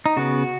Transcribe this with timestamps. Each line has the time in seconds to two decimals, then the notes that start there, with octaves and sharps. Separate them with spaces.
0.06 D#4
0.17 C#3 B3 F#4